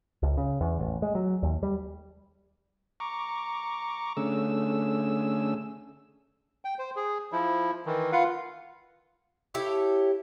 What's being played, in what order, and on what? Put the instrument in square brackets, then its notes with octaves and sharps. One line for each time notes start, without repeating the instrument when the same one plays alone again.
[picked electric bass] C#2
C#3
E2
A1
G#3
F#3
D#2
G3
[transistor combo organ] A#5 C#6 D6
D3 A3 C#4 G#4 E6
[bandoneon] G5
C5
G#4
F3 E4
D#3 E3
F4 B4 F5 F#5
[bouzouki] E4 G4 A4 C#5